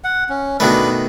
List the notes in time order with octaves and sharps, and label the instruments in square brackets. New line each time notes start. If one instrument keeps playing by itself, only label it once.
[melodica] F#5
C#4
[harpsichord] B2 D#3 A3 [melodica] D4 B4 B5